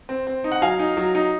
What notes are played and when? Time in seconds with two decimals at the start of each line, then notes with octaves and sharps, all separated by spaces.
0.09 C4
0.27 C4
0.44 D#4
0.52 F#5
0.62 F#3 F5 G#5
0.79 D#4
0.97 F#3
1.15 D#4